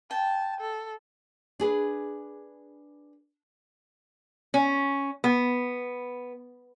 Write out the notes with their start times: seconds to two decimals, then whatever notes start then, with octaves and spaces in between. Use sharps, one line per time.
0.11 G5 A5
0.60 A4
1.60 D4 G#4 B4
4.54 C#4
5.24 B3